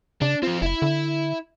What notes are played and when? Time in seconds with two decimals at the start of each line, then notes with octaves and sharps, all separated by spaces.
0.22 C#3 D4
0.43 F3 C4 F4
0.62 F#1 E4 E5
0.82 D3